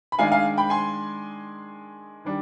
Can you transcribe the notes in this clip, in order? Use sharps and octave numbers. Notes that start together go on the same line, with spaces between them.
B5
D#3 G#3 D4 F5 G#5
F5 G#5
G5 B5
G#5 C6
D#3 G3 D4